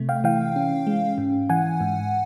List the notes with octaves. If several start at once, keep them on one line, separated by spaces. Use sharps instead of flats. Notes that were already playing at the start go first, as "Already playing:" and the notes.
Already playing: C3 A3
F5 G5
E3 F5 G5
C#4
G#3
G#2
E3 F#5 G#5
G#2